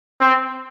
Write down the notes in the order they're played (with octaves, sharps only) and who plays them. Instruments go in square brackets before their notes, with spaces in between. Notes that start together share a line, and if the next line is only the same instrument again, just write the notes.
[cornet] C4